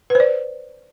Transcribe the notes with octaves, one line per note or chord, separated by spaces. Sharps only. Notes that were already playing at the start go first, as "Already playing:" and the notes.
B4 C5 D5